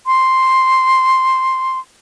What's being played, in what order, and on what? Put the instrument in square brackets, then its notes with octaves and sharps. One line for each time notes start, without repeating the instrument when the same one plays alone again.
[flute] C6